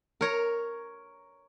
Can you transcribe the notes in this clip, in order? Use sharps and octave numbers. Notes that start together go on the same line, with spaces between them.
A#4 C#5 A#5